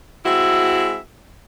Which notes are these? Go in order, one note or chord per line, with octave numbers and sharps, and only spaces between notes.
G#3 C4 E4 F#4 E5